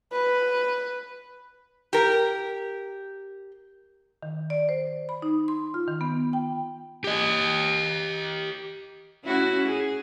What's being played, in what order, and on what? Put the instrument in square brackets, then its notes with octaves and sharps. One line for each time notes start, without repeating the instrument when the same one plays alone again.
[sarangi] B4
[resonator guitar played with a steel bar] G4 A#4
[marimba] D#3
D5
C5
B5
D#4
C6
F4
D#3
B3
G5
[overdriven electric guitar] G4 D#5
[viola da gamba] C#4 E4 F#4
G#4